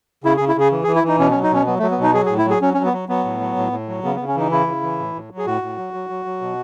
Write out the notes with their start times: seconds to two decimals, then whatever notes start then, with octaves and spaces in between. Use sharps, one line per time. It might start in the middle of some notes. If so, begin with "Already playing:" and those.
0.24 C#3 E4
0.36 G#4
0.40 C#3
0.48 E4
0.56 C#3 G#4
0.72 E3
0.84 G#4
0.87 E3
0.95 E4
1.03 E3 D#4
1.19 B2 C#4
1.31 C#4
1.35 F#3
1.43 D#4
1.51 B2 C#4
1.66 F#3 B3
1.79 A3
1.82 F#3
1.91 B3
1.98 B2 D#4
2.14 F#3 G#4
2.26 G#4
2.30 A2
2.38 E4
2.45 F#3
2.50 G#4
2.61 F#3 C#4
2.74 F#3 C#4
2.85 B3
2.93 F#3
3.09 F#3 B3
3.25 A2
3.40 F#3
3.56 A2
3.72 A2
3.88 F#3
4.04 C#3 B3
4.16 B3
4.20 C#3
4.27 C#4
4.35 E3 D#4
4.51 C#3 E4
4.67 C#3
4.83 E3
4.99 A2
5.15 A2
5.30 F#3
5.38 G#4
5.46 A2 F#4
5.62 A2
5.78 F#3
5.94 F#3
6.09 F#3
6.25 F#3
6.41 B2